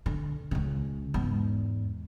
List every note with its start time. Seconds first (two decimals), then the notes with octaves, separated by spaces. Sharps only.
0.06 D3
0.51 C#2 C#3
1.14 E2 G#2